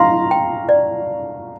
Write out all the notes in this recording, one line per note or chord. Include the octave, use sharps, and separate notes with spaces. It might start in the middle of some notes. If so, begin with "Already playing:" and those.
Already playing: F5 A#5 C6
G5
D5